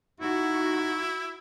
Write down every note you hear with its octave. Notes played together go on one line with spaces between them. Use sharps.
D#4 E4 F#4